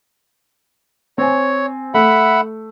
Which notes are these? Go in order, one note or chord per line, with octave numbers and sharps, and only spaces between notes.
C4 C#5 G#5
A3 E5 F#5 B5